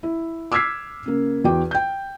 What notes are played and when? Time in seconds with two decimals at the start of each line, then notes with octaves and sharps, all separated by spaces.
0.03 E4
0.52 D6 E6 F6 G#6 B6 C7
1.06 C#3 A#3
1.44 E2 F#4 G5 D6
1.71 G5 G6